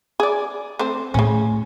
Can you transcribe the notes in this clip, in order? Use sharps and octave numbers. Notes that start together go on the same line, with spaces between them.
G#4 D5
A3 C4 C5
A2 C#3 A3 C#4